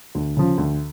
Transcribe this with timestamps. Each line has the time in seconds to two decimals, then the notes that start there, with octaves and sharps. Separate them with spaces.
0.15 D2
0.37 C#3 F3
0.58 D2